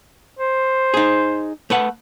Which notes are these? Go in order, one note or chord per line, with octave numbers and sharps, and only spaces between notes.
C5
D#4 G#4
A3 B4 F#5